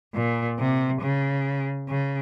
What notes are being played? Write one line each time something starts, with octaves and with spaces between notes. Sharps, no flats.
A#2
C3
C#3
C#3